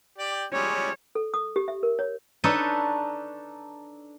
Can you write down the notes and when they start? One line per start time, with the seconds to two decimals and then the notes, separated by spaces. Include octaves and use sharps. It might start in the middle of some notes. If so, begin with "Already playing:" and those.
0.18 G4 D5 G5
0.52 G3 G#3 C#4 C#5
1.15 A4
1.34 D#6
1.56 G4
1.68 E5
1.83 A#4
1.99 C#5
2.44 D4 D#4 A4 B4 C#5 D#5